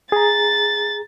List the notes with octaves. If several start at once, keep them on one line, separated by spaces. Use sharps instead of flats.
G#4 A#5 A6